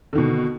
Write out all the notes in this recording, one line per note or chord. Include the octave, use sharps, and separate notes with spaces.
B2 D3 D#3